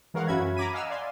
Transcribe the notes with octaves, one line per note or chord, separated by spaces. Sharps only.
E3 G#3 A#4 C#5 F5 F#5
F#2 C#4 F#4 E5 B5 G#6
A#5 B5 D6 G#6 B6 D#7
D#5 F5 F#5 G#5 E6 F6
D5 F5 G#5 C6